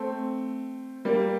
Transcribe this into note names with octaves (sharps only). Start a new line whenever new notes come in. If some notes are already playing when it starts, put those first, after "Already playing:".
Already playing: A3 C4
G3 A#3